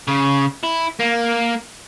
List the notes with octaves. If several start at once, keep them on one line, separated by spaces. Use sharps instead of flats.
C#3
E4
A#3